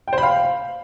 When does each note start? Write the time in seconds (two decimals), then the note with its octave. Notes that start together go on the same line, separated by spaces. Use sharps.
0.08 G5
0.13 C5
0.18 B5
0.23 F5